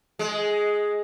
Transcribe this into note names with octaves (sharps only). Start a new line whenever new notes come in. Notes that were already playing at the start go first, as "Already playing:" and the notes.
G#3